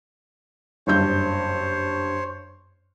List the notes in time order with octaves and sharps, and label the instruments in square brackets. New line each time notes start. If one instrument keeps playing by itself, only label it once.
[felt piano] F#1 G2 G6 [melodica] C5 C#5